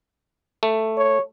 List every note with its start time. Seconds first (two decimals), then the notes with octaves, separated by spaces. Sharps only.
0.63 A3
0.97 C#5